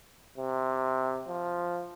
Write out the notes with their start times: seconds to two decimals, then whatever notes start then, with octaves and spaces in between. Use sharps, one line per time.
0.38 C3
1.28 F3